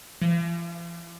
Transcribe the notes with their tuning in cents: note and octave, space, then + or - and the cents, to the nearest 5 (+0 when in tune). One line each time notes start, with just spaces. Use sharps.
F3 -45